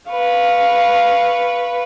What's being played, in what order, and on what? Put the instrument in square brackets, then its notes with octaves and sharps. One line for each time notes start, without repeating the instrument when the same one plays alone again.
[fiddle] B4 [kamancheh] F5 C#6